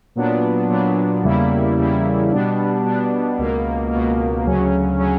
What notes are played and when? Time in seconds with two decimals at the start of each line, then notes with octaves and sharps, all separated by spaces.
0.16 A#2 F#3 B3 D4
0.70 A#2 F#3 B3 D4
1.23 E2 C#3 G3 A#3 E4
1.77 E2 C#3 G3 A#3 E4
2.31 B2 G3 B3 D4
2.85 B2 G3 B3 D4
3.38 C#2 B2 A#3
3.92 C#2 B2 A#3
4.46 D2 C#3 F#3 C#4
4.99 C#3 F#3 C#4